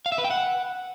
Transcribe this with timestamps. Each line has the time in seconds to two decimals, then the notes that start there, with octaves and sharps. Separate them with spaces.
0.06 F5
0.12 E5
0.18 B4
0.24 G5
0.31 F#5